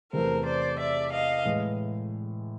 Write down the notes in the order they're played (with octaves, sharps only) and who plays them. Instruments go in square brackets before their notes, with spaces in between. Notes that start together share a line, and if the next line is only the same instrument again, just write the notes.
[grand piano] E2 C3 E3 A3 [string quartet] A#4 C5
[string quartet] C5 D5
D5 E5
D#5 F5
[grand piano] A2 E3 G#3